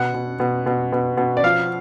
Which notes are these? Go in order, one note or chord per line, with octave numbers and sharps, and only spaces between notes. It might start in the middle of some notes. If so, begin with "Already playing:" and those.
Already playing: B2 F#5
B2
B2
B2
B2
B2
D5
F3 F5